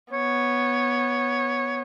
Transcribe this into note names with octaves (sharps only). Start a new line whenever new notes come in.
B3 C#5